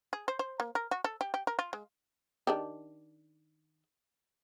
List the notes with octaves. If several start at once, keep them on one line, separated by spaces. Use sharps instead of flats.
G#4
C5
C5
A#3
A#4
F#4
A4
G4
G4
A#4
F4
G#3
D#3 D4 G4